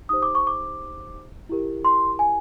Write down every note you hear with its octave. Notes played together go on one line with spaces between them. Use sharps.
D#4 G4 C5 D#6
D6
C#6
D6
E4 G4 A#4
C6
G#5